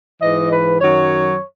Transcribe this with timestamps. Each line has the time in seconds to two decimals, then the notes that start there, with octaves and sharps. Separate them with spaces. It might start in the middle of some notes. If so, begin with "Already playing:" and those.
0.21 G#2 E3 D#5
0.50 B4
0.79 F#2 D#3 F#3 C#5